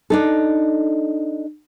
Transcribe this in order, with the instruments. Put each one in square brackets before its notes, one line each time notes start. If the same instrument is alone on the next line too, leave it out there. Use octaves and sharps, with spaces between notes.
[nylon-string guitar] D4 D#4 A4